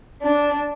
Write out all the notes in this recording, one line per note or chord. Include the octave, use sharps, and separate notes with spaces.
D4